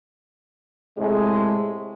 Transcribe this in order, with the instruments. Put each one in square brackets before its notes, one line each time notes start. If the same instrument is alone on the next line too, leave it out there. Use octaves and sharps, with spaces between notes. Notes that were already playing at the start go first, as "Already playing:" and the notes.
[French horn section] A2 C3 G#3